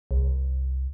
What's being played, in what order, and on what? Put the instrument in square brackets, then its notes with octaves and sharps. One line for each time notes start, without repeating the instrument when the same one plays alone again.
[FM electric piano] C2